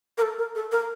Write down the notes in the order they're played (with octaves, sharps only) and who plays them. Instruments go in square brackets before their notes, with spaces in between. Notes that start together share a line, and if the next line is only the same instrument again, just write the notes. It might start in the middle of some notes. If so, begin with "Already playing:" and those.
[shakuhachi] A#4
A4
A#4
A4
A#4